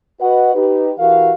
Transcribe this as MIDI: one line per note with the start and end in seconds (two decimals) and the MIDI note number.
0.21 0.52 66
0.21 0.52 71
0.21 0.52 75
0.21 0.52 78
0.55 0.92 63
0.55 0.92 67
0.55 0.92 71
0.99 1.32 52
0.99 1.32 66
0.99 1.32 67
0.99 1.32 70
0.99 1.32 77